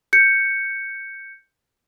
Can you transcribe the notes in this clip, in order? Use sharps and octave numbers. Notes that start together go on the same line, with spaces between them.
G6 C#7